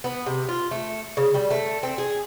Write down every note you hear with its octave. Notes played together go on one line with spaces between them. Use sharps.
B3
C3
F4
A3
C#3
G3
A3
C4
G#4